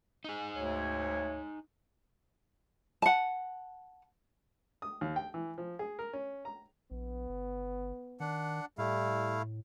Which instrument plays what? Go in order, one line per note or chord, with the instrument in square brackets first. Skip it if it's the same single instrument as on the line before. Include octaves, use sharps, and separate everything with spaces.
[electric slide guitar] D#4 G#4
[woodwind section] D2 C#5
[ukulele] F#5 A5
[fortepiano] D#6
D#2
G5
E3
F3
G#4
A#4
C#4
A#5
[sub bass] A#1 [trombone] B3
[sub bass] G1
[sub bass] D#3 [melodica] D4 F#5
[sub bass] A2 [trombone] G3 [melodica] A3 E4 F5